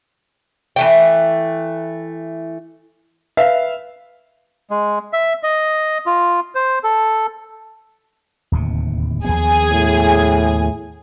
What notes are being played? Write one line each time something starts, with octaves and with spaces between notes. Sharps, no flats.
E3 A3 G5
B4 E5 F5
G#3
E5
D#5
F4
C5
A4
D1 D#2 C3
D#2 F3 B3 G#4 G#5
A2